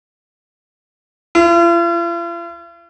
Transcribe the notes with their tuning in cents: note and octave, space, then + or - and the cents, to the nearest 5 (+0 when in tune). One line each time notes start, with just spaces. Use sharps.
F4 -45